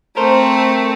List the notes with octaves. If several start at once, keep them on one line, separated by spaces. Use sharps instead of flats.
A3 C4 A#4 C5